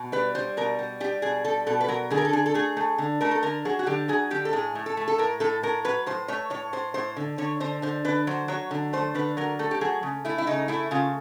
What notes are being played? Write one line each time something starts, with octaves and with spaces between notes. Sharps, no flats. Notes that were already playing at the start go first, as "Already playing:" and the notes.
Already playing: B2
G3 B4
G3 C5
B2 A#4
G3
G3 G4
B2 G#4
G3 A4
B2 A4
B4
F#3 A#4
D3 G#4
A#4
A4
D3 G#4
A4
A3 G#4
A3
D3
A3 A#4
A4
D3 A#4
F#3 G#4
F#4
D3 G4
F#3 G#4
D3 G4
A4
A2 G#4
A2
A4
A3
A4
A2 A#4
A2 A4
A2 A#4
F#3 B4
A2 C5
A3 C#5
A2 C#5
A2 C5
A2 C5
D3
D3 C#5
D3 C5
D3 C5
D3 B4
F#3 C5
F#3 C#5
D3
A3 C5
D3 B4
F#3 A#4
A3 A4
G4
F#3 G#4
C#3
A3 E4
E4
C#3 D#4
A3 E4
C#3 F4